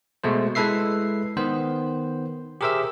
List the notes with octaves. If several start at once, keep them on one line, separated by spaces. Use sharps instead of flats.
B2 G#3 A3 C5
G#3 E4 A4 B4 E5 C7
D#3 B3 C5
G4 G#4 A#4 C5 E5 E6